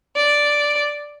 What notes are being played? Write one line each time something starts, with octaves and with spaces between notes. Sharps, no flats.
D5